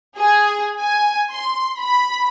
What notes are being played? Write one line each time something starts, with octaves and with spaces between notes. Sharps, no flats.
G#4
G#5
C6
B5